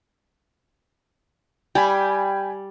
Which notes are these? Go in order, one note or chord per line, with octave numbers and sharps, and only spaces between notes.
G3 G5 G#5 B5